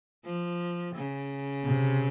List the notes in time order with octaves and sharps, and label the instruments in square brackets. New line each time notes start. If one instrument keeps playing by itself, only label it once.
[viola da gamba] F3
C#3
[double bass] C3